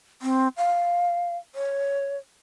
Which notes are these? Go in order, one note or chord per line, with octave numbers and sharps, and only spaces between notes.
C4
F5
C#5